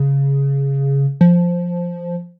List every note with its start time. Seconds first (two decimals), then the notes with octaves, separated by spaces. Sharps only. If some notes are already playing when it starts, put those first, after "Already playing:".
Already playing: C#3
1.21 F3